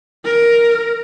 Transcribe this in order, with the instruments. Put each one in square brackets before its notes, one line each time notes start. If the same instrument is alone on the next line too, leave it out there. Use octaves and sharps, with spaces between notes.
[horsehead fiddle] A#4